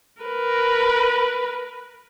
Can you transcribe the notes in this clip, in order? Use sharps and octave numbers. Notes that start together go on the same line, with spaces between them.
A#4 B4